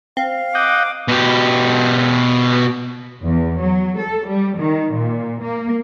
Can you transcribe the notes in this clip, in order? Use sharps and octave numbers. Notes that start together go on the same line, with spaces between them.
C4 F5
D#5 F#5 G5 D6
B2 G4
E2
F#3
A4
G3
D#3
A#2
A#3